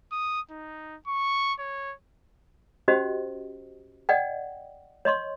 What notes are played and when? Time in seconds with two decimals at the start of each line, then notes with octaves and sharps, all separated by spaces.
0.12 D#6
0.51 D#4
1.07 C#6
1.59 C#5
2.88 C#4 F#4 G4 C5 D#5
4.09 D5 D#5 F#5 G5
5.05 C#5 D#5 C6 C#6